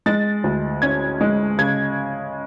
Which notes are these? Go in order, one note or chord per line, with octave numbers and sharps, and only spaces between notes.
G#3 A6
D2
C#4 G#6
G#3
C#3 G#6